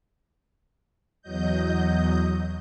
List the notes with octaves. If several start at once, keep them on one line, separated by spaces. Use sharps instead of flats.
E2 F#3 D#5 G6